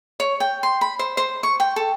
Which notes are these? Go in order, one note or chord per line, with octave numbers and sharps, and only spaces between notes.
C#5
G5
C6
B5
C5
C5
C#6
G5
A4